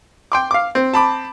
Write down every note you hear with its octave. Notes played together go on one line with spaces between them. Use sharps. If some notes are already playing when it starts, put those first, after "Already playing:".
G5 C6 D6
F5 D6
C4
A5 B5 D6